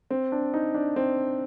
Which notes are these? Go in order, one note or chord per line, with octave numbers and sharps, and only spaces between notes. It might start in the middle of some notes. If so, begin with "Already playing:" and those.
C4
D4
D#4
D4
C4